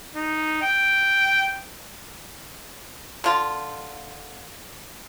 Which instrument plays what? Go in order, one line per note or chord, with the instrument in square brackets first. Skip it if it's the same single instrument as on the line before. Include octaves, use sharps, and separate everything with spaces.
[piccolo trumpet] D#4
G5
[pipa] D3 F4